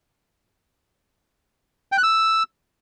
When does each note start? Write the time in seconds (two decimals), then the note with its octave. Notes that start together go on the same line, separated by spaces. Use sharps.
1.92 G5
1.98 F#6
2.03 E6